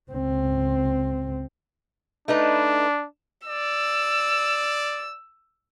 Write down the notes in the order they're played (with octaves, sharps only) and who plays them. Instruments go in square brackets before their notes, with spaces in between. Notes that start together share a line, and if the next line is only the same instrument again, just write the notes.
[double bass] C#2 C4
[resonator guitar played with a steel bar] A3 D#4 B4 [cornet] D4
[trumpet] D5 [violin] E6